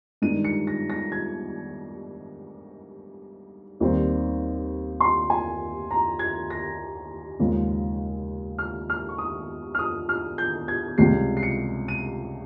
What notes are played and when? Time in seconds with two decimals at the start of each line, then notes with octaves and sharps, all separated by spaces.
0.22 G2 D#3 G#3 D#4 D#7
0.45 C#7
0.67 A#6
0.90 A#6
1.12 G#6
3.80 D#2 D#3 G3 C4
5.00 C6
5.30 G#5
5.91 A#5
6.19 G#6
6.50 A#6
7.39 D#2 C#3 F3 G#3 C#4
8.59 F6
8.90 F6
9.09 C#6
9.18 D#6
9.75 F6
9.79 D#6
10.09 F6
10.38 G6
10.68 G#6
10.98 C#2 C3 G3 C7
11.37 C7
11.43 C#7
11.88 D#7